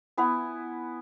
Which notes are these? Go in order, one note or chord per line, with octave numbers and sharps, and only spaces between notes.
B3 E4 G#5